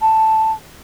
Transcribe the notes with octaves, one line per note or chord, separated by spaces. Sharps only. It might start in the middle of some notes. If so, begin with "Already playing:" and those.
A5